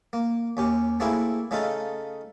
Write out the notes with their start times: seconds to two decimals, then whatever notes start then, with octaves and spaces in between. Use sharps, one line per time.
0.13 A#3
0.57 D#2 C#4 G4
1.00 A3 A#3 C4 E4 G#4
1.51 C#3 A3 D#4 F4 A4